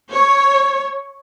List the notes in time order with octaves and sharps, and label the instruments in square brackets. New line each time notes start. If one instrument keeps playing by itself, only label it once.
[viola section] C#5